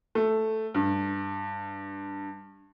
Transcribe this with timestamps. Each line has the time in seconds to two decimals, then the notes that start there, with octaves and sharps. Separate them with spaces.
0.15 A3
0.74 G2